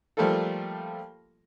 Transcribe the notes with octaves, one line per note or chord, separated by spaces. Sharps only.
F3 G3 A3 A#3 F4 A4